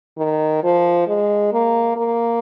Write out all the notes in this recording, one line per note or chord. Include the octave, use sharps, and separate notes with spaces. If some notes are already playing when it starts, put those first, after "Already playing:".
D#3
F3
G#3
A#3
A#3